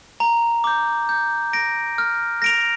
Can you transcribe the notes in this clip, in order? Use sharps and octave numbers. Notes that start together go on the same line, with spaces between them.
A#5
D6 G6
G6
A#6 D7
F6
A#6 D7 F7